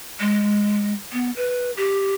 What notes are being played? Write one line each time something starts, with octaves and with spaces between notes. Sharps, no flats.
G#3
B3
B4
G4